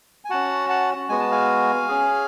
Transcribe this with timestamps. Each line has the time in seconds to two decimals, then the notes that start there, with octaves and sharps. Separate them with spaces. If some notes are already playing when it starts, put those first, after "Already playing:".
0.25 G#5
0.30 C#4 F#4 F#5 A5
0.69 F#5 A5
1.09 G#3 B3 F#4 G#5
1.20 A5
1.31 F5 G#5
1.88 C#4 G#4